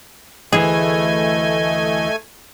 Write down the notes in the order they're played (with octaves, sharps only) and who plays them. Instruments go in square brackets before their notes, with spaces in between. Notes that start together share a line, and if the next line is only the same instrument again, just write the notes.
[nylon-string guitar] D2 E3 [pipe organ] A3 G#5 [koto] G#4 [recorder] D#5